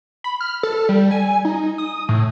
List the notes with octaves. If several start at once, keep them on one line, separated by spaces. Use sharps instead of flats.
B5
F6
A4
G3
G#5
D#4
D#6
A2